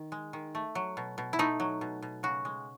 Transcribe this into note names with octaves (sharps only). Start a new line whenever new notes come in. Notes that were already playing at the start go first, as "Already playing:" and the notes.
Already playing: D#3
G#3
D#3
A3
F#3
B2
B2
E4
A3 D#4
F#3
B2
B2
C#3 F#4
G#3